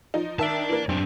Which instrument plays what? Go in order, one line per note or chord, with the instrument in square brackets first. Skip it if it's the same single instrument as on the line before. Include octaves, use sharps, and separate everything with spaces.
[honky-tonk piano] F3 D#4
[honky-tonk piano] D#3 E5 [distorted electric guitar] D5 A5
[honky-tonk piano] E3 A#3
[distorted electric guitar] F#2 D4 [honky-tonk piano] C4